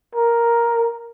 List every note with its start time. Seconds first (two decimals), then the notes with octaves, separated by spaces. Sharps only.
0.15 A#4